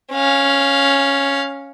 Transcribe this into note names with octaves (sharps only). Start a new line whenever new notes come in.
C#4 F5